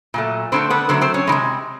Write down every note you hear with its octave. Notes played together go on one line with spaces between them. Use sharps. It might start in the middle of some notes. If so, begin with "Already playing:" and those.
A#2 F#3 A3
D3 F#3 A3 C4 C5
B3 B4
D3 F#3 A3 C4 C5
C4 C5
C#4 C#5
C3 E3 G#3